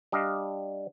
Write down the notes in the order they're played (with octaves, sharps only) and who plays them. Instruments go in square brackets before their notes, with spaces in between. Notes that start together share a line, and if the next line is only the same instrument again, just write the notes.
[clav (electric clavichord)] G3 D4 D#5 F5